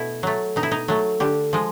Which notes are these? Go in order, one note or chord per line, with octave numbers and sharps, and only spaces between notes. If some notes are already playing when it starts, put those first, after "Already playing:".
Already playing: B2 A3 E4
F#3 A3
B2 D#4
E4
D#4
F#3 A3
D3 G4
F3 G#3